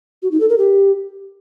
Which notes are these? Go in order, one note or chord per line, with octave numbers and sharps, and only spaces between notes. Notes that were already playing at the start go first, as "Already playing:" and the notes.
F#4
D#4
A4
A#4
G4